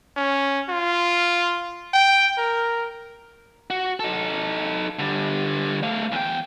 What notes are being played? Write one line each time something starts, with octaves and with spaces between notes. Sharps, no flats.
C#4
F4
G5
A#4
F#4
D#4 A4
D3 G3
A3 F5
E2 G5